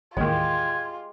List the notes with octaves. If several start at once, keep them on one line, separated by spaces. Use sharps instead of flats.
A1 D#2 G#3 F4 G4 G#6